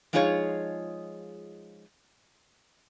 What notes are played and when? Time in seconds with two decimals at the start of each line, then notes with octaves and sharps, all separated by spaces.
0.13 F3 G#3 D#4 F4 G#4 C#5